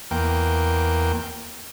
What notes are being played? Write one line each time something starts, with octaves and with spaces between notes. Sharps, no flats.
E2 A#3 G5